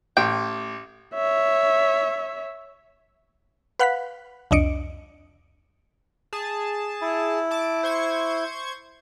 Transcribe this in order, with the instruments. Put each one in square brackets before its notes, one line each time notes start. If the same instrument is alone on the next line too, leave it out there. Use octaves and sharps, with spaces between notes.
[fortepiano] A1 [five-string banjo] G5
[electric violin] C#5 E5
[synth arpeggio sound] B4 F5 F#5 B5 F#6 B6
C2 F2 D4 D#5 C#7 D7
[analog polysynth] G#4 A5
[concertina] E4
[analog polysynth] A5 D6
C5 C#6 G#6